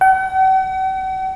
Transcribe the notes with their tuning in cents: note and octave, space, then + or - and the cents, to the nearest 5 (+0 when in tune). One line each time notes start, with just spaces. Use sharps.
F#5 +45